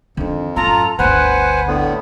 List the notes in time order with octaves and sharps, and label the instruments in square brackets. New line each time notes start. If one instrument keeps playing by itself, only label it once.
[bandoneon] F2 [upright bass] D#3 D4
[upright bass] F#2 A2 [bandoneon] F4 A4 [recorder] A#5
[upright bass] G1 D2 [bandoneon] B4 C5 G#5 [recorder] F#5
[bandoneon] A2 D3 B3